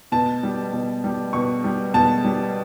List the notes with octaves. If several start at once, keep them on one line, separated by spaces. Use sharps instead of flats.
B2 A5
G3
B2
G3
B2 C#6
G3
B2 A5
G3